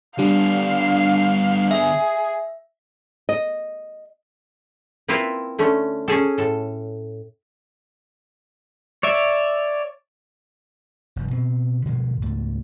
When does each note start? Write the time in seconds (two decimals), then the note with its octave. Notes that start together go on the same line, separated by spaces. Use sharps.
0.19 D3 G3 B3 D4 F5
1.71 G#4 E5
3.29 D#5
5.08 A#3 C4 E4 F4 B4
5.59 D3 A3 C#4
6.08 C#4 G#4 A4
6.38 A2 A4
9.03 C#5 D5 E5
11.16 F1 G2
11.31 B2 C4
11.85 B2 D3 F3 G#3
12.22 C#2 G#2 A3